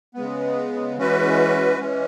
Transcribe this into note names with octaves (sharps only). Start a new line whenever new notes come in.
C#3 G#3 B3
E3 G#3 C#4 F#4 B4
E3 G#3 C#4